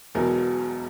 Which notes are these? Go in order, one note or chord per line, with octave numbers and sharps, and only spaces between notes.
E1 E2 B2 F#3 A#4